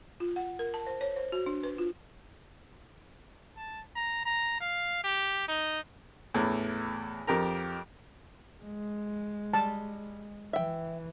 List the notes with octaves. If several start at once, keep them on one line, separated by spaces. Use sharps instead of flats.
F4
F#5
A#4
A5
C5
C#5
C5
F#4
D4
B4
F4
A5
A#5
A#5
F5
G4
D#4
E2 A2 E3
F2 G4 A#4 A#5
G#3
G3 A5
E3 E5 G5